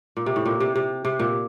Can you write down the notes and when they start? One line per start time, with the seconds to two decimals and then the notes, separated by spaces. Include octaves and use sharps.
0.17 A#2
0.26 C3
0.36 A2
0.46 A#2
0.60 C3
0.76 C3
1.05 C3
1.19 A#2